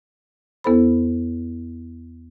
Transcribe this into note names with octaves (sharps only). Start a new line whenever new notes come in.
E2 B3 E4 A4 C5 B5